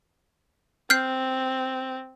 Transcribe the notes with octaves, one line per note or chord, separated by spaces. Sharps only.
C4 F6 G6 C7